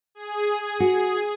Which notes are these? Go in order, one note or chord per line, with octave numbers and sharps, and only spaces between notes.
G#4
F#4